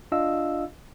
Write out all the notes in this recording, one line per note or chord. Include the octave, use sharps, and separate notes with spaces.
D4 F4 D#5 F5 E6